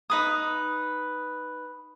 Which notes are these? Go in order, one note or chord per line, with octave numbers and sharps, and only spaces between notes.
D#4 B4 D#6